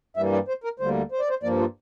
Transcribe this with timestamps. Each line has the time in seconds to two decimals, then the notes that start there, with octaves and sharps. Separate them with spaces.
0.17 G2 E3 G3 A#3 E5
0.32 D5
0.48 C5
0.64 A#4
0.79 D2 D3 G3 A#3 C5
1.12 C5
1.20 D5
1.30 C5
1.43 G2 F3 A#3 D5
1.59 F4